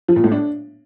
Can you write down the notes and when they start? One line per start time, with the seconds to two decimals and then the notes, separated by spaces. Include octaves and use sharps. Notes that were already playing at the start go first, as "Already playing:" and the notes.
0.08 F3
0.16 A#2
0.24 A2
0.32 D4